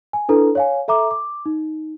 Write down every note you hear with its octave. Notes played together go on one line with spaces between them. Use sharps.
G#5
D4 E4 A4 B4 A#5
C#5 F5 G#5
A4 E5 A#5 D6
D6
D#4